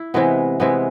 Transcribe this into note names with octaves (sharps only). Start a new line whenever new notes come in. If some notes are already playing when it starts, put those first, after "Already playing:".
Already playing: E4
C3 E3 G#3 B3
C3 E3 G#3 B3